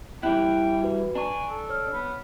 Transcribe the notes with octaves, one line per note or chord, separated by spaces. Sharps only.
E3 G3 E4 G5 F#6
F#4 B4
D4 G#5 A#5 C#6
A4
C#5 F6
B3